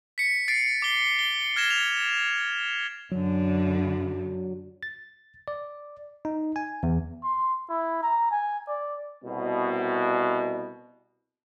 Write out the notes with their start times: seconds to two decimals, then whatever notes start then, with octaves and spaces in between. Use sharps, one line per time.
0.18 B6 C#7
0.48 A6 C7 D7
0.82 D6 G7
1.19 G7
1.56 F6 G#6 A#6 E7 G7
1.70 F7
3.12 F#2 D3 F#3
4.83 A6
5.48 D5
6.25 D#4
6.56 G#5
6.83 E2
7.24 C6
7.69 E4
8.03 A#5
8.31 G#5
8.68 D5
9.24 C2 B2